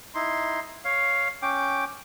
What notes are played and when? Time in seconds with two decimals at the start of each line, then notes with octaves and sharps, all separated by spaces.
0.15 D#4 E4 C6
0.85 C#5 F5
1.42 C#4 G5 D6